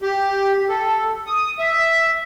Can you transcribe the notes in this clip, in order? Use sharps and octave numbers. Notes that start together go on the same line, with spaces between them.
G4
A4
D#6
E5